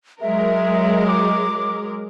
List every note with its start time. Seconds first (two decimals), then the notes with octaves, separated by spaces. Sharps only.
0.22 F#3 G#3 A#4 E5
1.08 D6